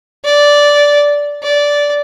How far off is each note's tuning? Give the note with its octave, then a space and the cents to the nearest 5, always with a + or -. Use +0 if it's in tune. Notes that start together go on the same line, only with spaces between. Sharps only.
D5 -10
D5 -15